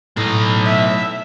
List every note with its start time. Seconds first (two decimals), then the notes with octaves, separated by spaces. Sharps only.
0.17 B1 A2 D#4
0.65 E5